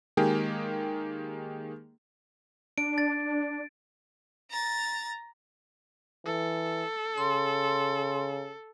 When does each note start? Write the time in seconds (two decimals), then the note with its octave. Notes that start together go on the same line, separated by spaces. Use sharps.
0.17 D#3 G#3 A#3 G4 G#4
2.78 D4 D7
2.98 A6
4.50 A#5 A6
6.26 E3 A4
7.18 C#3 C6